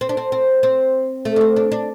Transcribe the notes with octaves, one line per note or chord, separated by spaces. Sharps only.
C4
D4
C4
C4
C4
A3
D4
C4
D4
D4